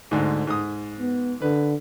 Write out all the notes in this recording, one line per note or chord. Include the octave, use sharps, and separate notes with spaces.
D2 G#2
G#2 D#6
B3
D3 B4